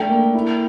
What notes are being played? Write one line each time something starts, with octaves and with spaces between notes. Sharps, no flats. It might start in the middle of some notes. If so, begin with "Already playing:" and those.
Already playing: A3 D4 G5
A#3
E4